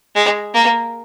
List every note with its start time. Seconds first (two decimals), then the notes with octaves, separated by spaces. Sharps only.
0.15 G#3
0.54 A#3